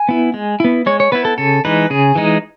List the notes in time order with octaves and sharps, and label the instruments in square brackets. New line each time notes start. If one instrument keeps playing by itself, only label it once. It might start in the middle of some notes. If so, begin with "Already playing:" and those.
Already playing: [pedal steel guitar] G#5
B3 E4
G#3
B3 E4
G#3 C#5
C#5
B3 E4 B4
A4
C#3 A4
E3 G#3 D#4 B4
C#3 G#4
E3 G#3 D#4